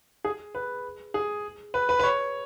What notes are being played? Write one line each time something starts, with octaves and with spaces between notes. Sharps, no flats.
G#4
B4
G#4
B4
B4
B4
C#5